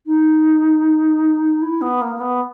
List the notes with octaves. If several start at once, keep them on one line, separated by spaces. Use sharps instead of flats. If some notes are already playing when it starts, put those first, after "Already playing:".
D#4
E4
B3
A#3
A#3
B3